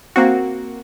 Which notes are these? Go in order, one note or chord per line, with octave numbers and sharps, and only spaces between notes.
A#3 C4 F#4